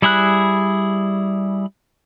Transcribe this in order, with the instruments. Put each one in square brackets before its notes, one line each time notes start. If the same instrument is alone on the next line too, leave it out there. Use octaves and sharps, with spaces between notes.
[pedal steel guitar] G3 E4 G#4 B5 F#6